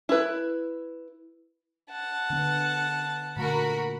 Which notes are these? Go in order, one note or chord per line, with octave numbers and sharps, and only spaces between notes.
E4 B4
F#5 A5
D3 B3
A#2 D3 A3 F#4 A#4 B5